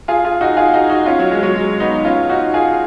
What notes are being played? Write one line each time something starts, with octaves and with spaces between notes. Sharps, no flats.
F4 G#4
F4 G#4
D#4 F#4
F4 G#4
D#4 F#4
D#4 F#4
C#4 F4
F#3
G#3
F#3
G#3
B3 D#4
C#4 F4
D#4 F#4
F4 G#4